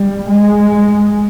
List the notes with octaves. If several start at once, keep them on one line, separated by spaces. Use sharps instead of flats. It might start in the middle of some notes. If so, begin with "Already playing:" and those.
Already playing: G3
G#3